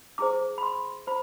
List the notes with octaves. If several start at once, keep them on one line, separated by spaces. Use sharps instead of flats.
E4 G#4 C5 D6
B5
C6
E4 C5 B5